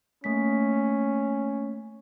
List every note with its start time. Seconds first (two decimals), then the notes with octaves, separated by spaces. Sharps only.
0.24 A3 A#3 C#4 B6